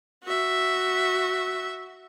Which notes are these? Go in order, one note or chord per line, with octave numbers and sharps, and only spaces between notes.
F#4 E5